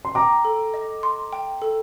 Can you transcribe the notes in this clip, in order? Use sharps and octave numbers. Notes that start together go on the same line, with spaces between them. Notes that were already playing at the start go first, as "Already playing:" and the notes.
C6
G5 A#5 D6
A4
D#5
C6
G5
A4